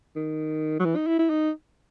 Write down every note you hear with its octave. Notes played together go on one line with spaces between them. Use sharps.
D#3
F#3
E3
D#4
E4
E4
D#4